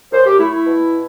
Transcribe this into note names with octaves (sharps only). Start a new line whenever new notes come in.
F#2 C5
G4
A3 E4
E4
B2